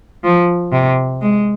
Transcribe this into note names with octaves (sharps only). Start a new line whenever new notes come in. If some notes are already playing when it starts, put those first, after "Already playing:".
F3
C3
G#3